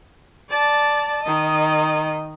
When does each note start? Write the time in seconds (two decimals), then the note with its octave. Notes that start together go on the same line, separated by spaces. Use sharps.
0.49 D5 A5
1.22 D#3 D#5